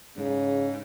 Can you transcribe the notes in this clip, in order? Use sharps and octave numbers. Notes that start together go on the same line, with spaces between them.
G#2 C#3